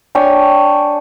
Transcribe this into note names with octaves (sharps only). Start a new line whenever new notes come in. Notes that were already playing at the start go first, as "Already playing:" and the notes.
D4 C#5 G5 G#5